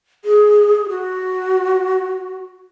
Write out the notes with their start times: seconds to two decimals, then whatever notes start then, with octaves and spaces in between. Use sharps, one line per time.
0.25 G#4
0.89 F#4